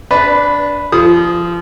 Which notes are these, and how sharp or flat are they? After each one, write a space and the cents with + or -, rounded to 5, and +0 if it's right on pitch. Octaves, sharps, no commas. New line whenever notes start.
D4 -10 B4 +0
F3 -25 D#6 +0